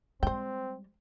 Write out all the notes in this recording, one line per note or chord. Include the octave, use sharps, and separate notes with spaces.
G3 G#3 C4 C5 G5